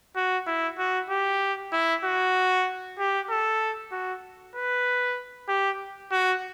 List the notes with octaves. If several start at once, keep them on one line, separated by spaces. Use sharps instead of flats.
F#4
E4
F#4
G4
E4
F#4
G4
A4
F#4
B4
G4
F#4